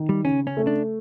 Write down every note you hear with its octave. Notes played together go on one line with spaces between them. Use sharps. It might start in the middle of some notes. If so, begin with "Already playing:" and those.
Already playing: D#3
G3
C#3 C#4
C#4
A3
D4